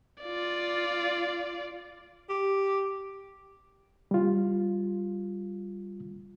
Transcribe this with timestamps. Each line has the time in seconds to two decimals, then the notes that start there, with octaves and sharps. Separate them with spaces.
0.23 F4 D5
2.30 G4
4.11 G3 F4